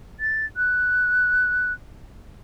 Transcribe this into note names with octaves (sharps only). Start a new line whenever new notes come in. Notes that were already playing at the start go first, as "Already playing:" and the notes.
A6
F#6